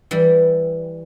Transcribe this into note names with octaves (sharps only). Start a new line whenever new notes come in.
E3 G3